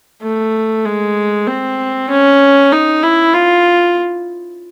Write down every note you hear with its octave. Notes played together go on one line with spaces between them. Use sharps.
A3
G#3
C4
C#4
D#4
E4
F4